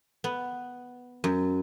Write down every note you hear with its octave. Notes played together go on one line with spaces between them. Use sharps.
B3
F#2